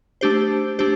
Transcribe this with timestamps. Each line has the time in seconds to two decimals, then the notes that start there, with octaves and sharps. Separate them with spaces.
0.21 A3 D4 G4 C5
0.79 A3 D4 G4 C5